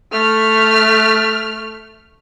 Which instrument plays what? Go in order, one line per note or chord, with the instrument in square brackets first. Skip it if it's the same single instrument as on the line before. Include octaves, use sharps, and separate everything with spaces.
[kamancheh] A3 F6